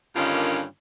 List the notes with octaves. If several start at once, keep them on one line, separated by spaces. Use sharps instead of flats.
G2 D3 D#3 A#3 C#4 F4